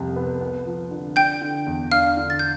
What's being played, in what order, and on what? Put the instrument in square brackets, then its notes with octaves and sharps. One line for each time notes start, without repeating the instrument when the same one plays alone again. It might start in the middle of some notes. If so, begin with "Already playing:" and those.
Already playing: [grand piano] C2 F2 C3
B3
B3
F3
D3
[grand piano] D4 [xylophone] G5 G6
[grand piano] D3
E2
[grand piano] D4 [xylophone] F5 F6
[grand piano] D3
[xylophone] A6
G6